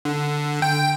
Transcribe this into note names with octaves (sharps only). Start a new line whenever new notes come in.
D3
G5